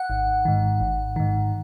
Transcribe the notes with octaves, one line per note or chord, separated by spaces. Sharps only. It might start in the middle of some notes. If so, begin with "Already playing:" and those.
Already playing: F#5
G#1
G#2 D#3
G#1
G#2 D#3